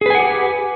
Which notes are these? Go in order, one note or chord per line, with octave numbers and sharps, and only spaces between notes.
G4 G#4 B4 F#5 G#5